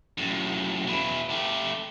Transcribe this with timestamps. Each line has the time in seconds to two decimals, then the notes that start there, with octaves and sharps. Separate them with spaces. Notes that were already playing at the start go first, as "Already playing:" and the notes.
0.18 F#2 A2
0.87 B2 E4
1.30 A3 G4